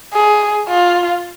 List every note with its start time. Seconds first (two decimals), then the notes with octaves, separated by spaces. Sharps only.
0.14 G#4
0.68 F4